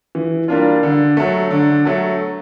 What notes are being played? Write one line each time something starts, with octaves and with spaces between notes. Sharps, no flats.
E3
G3 A#3 D4 F4
D3
F#3 A3
D3
F#3 A3